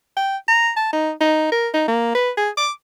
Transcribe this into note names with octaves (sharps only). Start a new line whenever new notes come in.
G5
A#5
A5
D#4
D#4
A#4
D#4
A#3
B4
G#4
D6